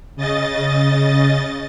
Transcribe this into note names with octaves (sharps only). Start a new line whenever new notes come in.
C#3 D#5 A6